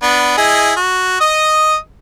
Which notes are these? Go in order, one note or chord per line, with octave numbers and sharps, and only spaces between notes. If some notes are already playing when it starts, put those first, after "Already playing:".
B3 D4
E4 G#4 D#5
F#4
D#5 D#6